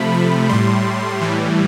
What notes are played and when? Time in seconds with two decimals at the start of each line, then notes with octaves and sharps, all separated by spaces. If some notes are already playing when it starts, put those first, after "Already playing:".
Already playing: C3 F3 A3 B5
0.13 B5
0.49 A2 G3 C6
1.20 A2 E3 G3